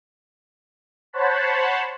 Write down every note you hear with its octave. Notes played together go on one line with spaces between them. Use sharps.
C5 C#5 F#5 A5 B5